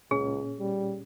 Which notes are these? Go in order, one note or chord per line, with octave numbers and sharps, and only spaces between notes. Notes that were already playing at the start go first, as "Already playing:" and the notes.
C#2 A#2 C#4 G#4
G3